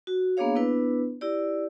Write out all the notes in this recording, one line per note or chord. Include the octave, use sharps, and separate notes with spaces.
F#4
A#3 B3 D4 G#4 C#5 F5
B3 D4 E4 B4
E4 G4 D5